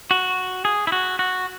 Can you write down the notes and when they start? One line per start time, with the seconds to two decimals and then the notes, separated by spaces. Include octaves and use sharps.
0.11 F#4
0.65 G#4
0.87 E4
0.92 F#4
1.19 F#4